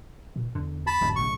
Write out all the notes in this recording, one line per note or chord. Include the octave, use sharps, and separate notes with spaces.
A#2
E2 D3
A5 B5
G1 E2 G#2 D3
B1 A2 C#3 C#6